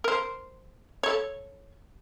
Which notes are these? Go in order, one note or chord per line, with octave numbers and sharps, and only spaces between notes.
A#4 C5
A4 C#5